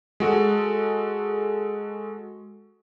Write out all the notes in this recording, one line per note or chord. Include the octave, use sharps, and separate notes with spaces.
G#3 F#4 A4